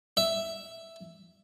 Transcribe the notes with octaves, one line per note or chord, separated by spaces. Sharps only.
E5